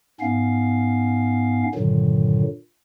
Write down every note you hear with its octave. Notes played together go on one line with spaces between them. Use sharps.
G#2 B3 C#4 F5
G2 A#2 D3 D#3 F#3